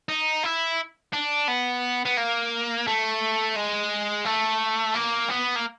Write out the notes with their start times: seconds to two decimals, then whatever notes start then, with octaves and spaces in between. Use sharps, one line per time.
0.09 D#4
0.43 E4
1.13 D4
1.48 B3
2.05 B3
2.17 A#3
2.87 A3
3.56 G#3
4.25 A3
4.95 A#3
5.29 B3
5.56 A#3